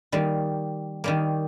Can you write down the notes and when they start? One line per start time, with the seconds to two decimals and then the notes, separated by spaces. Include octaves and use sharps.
0.12 D#3 G3 A#3
1.04 D#3 G3 A#3